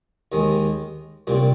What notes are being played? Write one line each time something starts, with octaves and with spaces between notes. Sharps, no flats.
D#2 D#3 G#3
C2 A#2 G3